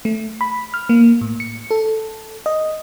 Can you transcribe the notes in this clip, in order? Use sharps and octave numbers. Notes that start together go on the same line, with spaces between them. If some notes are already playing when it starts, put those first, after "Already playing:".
A3
B5
F6
A#3
A2
C#7
A4
D#5